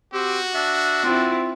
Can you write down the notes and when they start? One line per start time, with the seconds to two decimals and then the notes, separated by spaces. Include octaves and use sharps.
0.13 C4 F#4 G4
0.54 D4 E5
1.04 C4 E4 F4